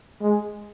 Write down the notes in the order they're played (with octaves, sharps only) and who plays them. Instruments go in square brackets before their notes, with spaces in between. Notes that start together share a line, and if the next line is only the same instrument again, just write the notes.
[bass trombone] G#3